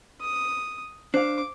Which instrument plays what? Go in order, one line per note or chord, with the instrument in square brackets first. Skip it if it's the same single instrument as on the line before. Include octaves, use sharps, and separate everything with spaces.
[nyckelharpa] D#6
[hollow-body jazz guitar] D4 F5 [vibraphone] C5 [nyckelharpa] D6